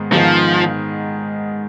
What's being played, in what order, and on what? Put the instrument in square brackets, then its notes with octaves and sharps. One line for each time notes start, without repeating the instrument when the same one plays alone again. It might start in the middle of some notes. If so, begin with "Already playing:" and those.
Already playing: [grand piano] G#2 D#3 G#3 B3
[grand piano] G#2 D#3 G#3 B3 [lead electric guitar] F3